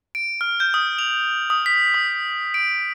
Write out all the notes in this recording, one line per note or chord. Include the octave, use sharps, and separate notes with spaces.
D7
F6
G6
D#6
F7
D#6
B6
D#6
D7